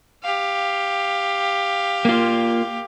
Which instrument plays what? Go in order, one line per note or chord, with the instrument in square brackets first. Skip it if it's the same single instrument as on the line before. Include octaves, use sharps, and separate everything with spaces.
[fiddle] G4 F5
[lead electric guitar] A#3 F4